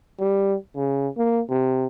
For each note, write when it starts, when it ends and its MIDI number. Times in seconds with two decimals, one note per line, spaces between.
0.20 0.55 55
0.76 1.08 49
1.17 1.41 58
1.50 1.87 48